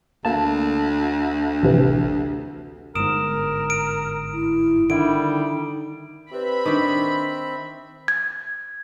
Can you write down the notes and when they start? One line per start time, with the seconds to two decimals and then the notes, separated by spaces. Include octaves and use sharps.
0.25 D2 A#3 A5
1.63 A1 C3 E3
2.95 G1 G#2 A#4 D#6 D7 E7
3.70 D7
4.33 E4
4.90 D3 D#3 G3 D#4 E4 D7
6.31 C4 G4 B4 D5 E5 B5
6.66 D#3 D4 C6 C#6
8.08 G#6